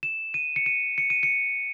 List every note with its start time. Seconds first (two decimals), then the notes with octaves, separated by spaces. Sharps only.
0.03 E7
0.34 D#7
0.56 C#7
0.66 D#7
0.98 C#7
1.10 D#7
1.23 C#7